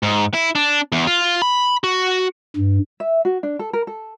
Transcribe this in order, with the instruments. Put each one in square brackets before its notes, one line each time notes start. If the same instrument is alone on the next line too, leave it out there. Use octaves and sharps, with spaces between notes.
[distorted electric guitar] G#2
E4
D4
E2
F4
B5
F#4
[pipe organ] G2
[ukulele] E5
F#4
D4
A4
A#4
A4